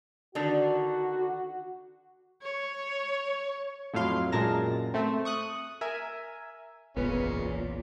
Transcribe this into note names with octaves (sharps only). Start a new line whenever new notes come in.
D3 D#3 D4 F#4
C#5
F2 A2 F#3 F5 C6
F#2 A#2 G#3 A#4 A5 A#6
A3 C4
C#6 D#6 F#6
A#4 E5 G#5
F#1 B1 E2 A#2 G#3 B3 C#4